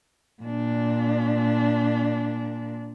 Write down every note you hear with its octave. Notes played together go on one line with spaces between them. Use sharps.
A#2 D4